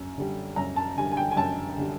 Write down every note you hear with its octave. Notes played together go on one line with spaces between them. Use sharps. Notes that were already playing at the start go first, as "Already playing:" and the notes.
Already playing: F#2
D3 G3
F#2 A#5
A5
D3 G3 G#5
G#5
G5
G#5
F#2 A5
D3 G3